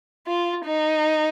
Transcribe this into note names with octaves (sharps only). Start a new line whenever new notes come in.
F4
D#4